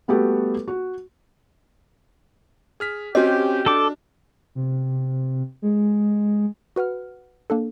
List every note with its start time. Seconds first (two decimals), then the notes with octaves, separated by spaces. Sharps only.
0.08 G3 A3 B3 F#4 G4 A4
0.68 F#4
2.80 G#4 F6 B6
3.15 C4 C#4 F#4 G4 D#5
3.66 D4 A4 A5 D6
4.55 C3
5.62 G#3
6.76 F#4 B4 F#5 F6
7.50 A#3 D4 A4